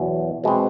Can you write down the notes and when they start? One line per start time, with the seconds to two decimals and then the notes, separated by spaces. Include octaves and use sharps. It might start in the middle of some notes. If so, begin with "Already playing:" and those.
Already playing: E2 B2 F#3 B3
0.44 B2 G#3 C4